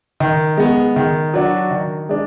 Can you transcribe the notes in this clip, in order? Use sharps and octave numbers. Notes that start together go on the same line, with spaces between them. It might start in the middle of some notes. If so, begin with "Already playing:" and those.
D#3
G#3 B3
D#3
F#3 D4 F#4
D#3
G#3 D4